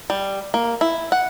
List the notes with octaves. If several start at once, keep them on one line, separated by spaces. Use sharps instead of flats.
G3
A#3
E4
F#5